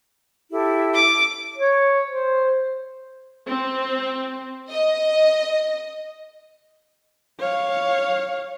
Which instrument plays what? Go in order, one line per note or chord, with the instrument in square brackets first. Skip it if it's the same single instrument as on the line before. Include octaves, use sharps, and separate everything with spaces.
[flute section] E4 G4 A4
[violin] D6
[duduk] C#5
C5
[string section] C4
D#5
[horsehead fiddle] C#5 F5